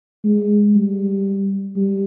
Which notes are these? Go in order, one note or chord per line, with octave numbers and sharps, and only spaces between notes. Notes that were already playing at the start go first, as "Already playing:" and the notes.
G#3
G3
G3